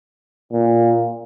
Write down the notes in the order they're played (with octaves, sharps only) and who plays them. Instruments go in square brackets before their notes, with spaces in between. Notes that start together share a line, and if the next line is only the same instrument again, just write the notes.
[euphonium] A#2